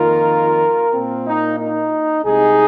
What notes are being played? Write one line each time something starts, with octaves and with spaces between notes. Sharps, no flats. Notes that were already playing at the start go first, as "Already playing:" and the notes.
Already playing: F2 D#3 A#3 F4 A#4
A#2 A#3 C4
D#4
D#4
C2 C3 G#3 D#4 G#4